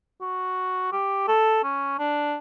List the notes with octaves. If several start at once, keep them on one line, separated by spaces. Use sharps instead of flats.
F#4
G4
A4
C#4
D4